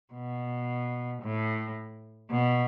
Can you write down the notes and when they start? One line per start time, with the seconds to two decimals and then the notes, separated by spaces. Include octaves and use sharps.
0.13 B2
1.22 A2
2.30 B2